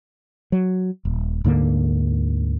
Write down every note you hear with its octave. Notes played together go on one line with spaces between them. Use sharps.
F#3
D#1
D2 G#2 D3 A#3